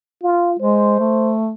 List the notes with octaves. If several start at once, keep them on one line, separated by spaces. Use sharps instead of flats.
F4
G#3 C5
A3